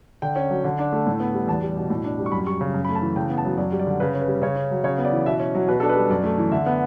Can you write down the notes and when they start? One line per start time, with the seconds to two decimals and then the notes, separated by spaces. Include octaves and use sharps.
0.22 D3 G5
0.36 C#4
0.50 F#3
0.64 D3
0.79 D4
0.93 A3
1.07 A2
1.20 B3
1.34 G3
1.48 E2 A5
1.62 G3
1.77 B2
1.90 A2
2.04 D4
2.19 G3
2.26 C#6
2.32 F#2 B5
2.47 G3 C#6
2.61 C#3
2.74 F#2
2.85 A3 B5
2.95 A5
3.02 E3
3.16 C#3 G5
3.30 B3
3.38 A5
3.45 F#3
3.58 F#2 D5
3.72 G3
3.79 D5
3.87 D3
4.00 C#3 B4
4.14 C#4
4.21 B4
4.28 G3
4.42 C#3 C#5
4.56 C#4
4.71 F#3
4.84 C#3 C#5
4.98 B3
5.05 D5
5.12 E3
5.26 B2 E5
5.40 C#4
5.55 F#3
5.68 B2 B4
5.80 D4 A4
5.89 B4
5.96 G3
6.10 F#2 D5
6.24 A3
6.38 E3
6.52 D3 E5
6.66 B3